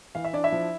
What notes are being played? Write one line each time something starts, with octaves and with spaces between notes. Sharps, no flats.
E3 F5
E5
D4 D5
E4 E5
F3